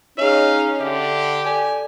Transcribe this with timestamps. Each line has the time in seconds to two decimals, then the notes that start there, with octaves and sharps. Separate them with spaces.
0.18 C#4 D#4 G#4 C#5 F5
0.81 D3 G4 E5
1.45 A4 D5 G#5